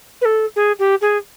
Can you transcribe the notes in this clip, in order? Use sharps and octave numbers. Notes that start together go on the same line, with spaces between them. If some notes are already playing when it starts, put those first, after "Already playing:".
B4
A4
G#4
G4
G#4